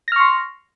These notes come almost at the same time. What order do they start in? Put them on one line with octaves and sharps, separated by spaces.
A#6 F6 C#6 C6